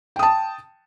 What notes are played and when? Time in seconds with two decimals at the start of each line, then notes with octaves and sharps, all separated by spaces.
0.16 G5
0.19 D#6
0.23 A5